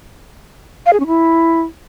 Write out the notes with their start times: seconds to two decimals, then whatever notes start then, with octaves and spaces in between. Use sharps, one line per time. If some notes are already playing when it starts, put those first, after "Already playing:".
0.86 F5
0.93 G#4
1.00 C#4
1.07 E4